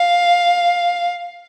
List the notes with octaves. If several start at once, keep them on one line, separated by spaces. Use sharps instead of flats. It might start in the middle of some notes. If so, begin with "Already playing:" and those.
Already playing: F5